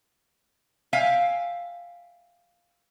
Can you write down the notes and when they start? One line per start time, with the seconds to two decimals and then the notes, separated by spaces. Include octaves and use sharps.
0.93 E5 F5 G5 G#5